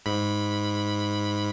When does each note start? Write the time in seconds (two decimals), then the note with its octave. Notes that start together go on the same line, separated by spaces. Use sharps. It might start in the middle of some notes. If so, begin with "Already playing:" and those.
0.06 G#2 B5